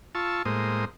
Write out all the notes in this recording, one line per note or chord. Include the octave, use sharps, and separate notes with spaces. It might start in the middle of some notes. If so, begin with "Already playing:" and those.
F4 A5 C#6 E6
A2 G#3 A#3 C5 D#6